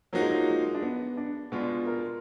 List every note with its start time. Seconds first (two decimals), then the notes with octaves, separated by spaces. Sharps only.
0.13 F3 F#3 A#3 D#4 F#4
0.22 G#3
0.30 F#3
0.48 G#3
0.75 D4
0.82 B3
1.17 D4
1.52 B2 G#3 B3 D4 F4
1.87 A#4